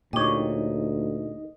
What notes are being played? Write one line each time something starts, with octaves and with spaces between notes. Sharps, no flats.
D2 A#2 D#4 G4 C#5 D#5